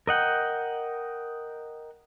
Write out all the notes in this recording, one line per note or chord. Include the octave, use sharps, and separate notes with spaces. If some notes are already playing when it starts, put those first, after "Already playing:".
A#4 D#5 F#5 G5